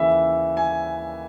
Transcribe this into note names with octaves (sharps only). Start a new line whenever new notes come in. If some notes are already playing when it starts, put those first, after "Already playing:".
Already playing: D#2 C#3 E3 E5
G#5